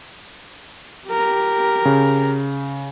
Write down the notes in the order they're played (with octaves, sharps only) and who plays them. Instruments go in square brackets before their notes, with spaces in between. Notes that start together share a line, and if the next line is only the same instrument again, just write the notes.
[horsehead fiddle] G4 A#4
[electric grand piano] C#3